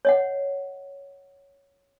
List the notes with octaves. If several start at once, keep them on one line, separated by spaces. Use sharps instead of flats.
C#5 D#5 F#5